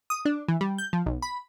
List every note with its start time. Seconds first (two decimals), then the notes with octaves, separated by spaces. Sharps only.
0.10 D#6
0.25 D4
0.48 E3
0.61 G3
0.78 G6
0.93 F3
1.06 B1
1.22 B5